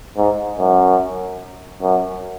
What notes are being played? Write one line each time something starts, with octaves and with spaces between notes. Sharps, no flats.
G#2
F#2
F#2